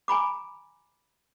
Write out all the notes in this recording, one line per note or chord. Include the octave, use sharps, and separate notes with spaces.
G#5 A#5 B5 D6